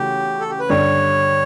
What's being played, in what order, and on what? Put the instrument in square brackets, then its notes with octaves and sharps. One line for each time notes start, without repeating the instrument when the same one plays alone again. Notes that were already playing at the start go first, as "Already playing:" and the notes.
Already playing: [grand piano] C#3 E3 A3 C#4 F#4 [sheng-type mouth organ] G4
[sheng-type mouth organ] A4
G4
B4
[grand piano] G2 D3 G3 [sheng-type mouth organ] C#5